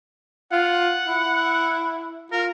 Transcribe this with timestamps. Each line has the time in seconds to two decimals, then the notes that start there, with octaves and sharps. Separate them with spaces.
0.52 F4 F#5
1.07 E4
2.32 F4 A#4